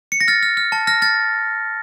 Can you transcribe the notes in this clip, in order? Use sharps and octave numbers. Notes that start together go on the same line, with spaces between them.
C#7
A#6
F6 A6
F6
F6
A5
F6 A#6
F6 A6